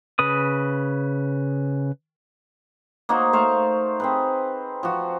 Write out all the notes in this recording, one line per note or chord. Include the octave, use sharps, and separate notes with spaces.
C#3 B4 D#6
A#3 D#4 F#4 C5
A3 C5 F5 C#6
C4 G#4 B4
F3 F#4